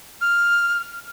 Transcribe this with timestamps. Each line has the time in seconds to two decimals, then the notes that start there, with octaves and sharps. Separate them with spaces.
0.21 F6